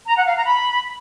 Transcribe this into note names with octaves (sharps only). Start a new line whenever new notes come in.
A#5
F#5
F5
A#5
B5